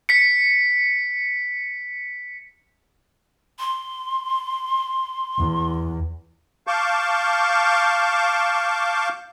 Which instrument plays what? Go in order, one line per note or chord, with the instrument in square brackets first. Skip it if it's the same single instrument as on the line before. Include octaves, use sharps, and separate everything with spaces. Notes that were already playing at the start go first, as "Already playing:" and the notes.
[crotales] B6 C#7
[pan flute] C6
[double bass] E2
[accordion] F5 A5 C#6 D6 G6